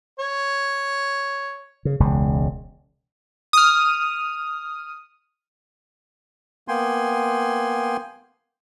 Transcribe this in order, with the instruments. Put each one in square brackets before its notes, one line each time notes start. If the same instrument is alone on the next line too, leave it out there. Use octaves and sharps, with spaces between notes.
[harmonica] C#5
[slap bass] C#3
E1 C#2 C#3
[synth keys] D#6 F6
[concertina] A#3 B3 G5 G#5 C6